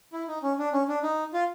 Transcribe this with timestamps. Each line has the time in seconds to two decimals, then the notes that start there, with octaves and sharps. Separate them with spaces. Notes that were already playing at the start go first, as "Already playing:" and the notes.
0.13 E4
0.28 D#4
0.43 C#4
0.58 D4
0.73 C#4
0.88 D4
1.03 D#4
1.34 F4